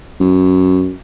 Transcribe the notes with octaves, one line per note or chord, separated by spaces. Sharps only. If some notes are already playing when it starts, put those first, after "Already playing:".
F#2